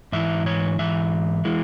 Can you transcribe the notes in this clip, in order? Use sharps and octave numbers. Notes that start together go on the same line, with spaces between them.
G#2 E3 E4 E5
C#5
G#2 E3 E5
E3 G#3 E4